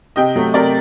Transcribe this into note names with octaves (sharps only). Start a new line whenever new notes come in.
C3 D#5 G5
F#3 A3
C3 A#4 D5